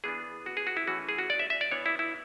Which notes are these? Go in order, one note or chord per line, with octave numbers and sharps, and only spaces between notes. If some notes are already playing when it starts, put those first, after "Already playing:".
E3 B3 D4 G#4
F#4
G#4
F#4
E4
E3 A3 C#4 F#4
G#4
F#4
D5
E5
E5
D5
E3 B3 D4 C#5
E4
E4